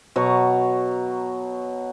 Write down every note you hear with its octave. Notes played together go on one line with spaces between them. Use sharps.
B2 F#3 A#5 C#6